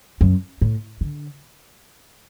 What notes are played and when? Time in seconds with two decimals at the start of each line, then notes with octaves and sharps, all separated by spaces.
0.21 F#2
0.61 A2
1.01 D3